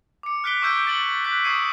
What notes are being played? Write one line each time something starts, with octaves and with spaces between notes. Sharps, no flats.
D6 C#7
F6 F#6 B6 D7 G7
C#6 E6 G6 G#6 D7
A6 C#7 F#7 G7
F#6 B6
C#6 D#6 G#6 C7 C#7 D#7